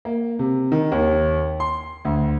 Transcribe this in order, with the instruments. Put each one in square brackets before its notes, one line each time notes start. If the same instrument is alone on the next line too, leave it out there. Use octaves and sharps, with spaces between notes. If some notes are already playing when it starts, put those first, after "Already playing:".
[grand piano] A#3
C3
D#3
D#2
C6
D2